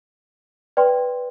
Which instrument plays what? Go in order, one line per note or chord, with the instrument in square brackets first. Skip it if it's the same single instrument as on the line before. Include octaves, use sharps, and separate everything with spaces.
[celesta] B4 D5 G5 C6